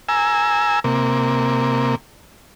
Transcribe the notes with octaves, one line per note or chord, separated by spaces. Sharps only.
G#5 A#5 E6
C3 A#3